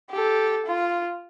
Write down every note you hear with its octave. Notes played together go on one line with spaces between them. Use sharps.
G4 A4
F4